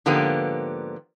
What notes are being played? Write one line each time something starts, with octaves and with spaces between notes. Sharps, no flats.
G#2 D3 F3 A#3 B3 G4